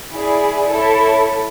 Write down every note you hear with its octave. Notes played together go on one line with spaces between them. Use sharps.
E4 G#4 D5
E4 A4 C#5